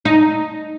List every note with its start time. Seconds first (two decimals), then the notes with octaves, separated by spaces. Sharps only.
0.05 D#4